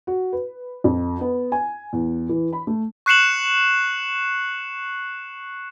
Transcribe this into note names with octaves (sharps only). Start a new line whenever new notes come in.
F#4
B4
F2
B3
G#5
E2
E3
B5
A3
C#6 F#6 C7 C#7 E7 F#7